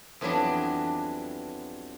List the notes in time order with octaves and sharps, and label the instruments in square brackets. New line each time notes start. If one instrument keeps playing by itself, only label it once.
[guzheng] F2 E3 F#3 G3 B3 D4